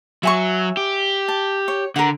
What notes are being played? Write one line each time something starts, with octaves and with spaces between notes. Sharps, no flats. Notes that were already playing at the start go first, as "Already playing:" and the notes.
F#3 E5 G#5 C#6
G4
A5
C#5
D3 A#4 F#5